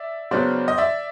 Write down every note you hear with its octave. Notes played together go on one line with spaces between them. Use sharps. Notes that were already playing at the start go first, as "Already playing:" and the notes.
Already playing: D5 E5
C#3 F#3 B3 D4 C5 D5
D#5
D5 E5